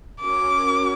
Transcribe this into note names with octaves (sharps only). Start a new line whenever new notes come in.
C#4 F#4 A#4 D6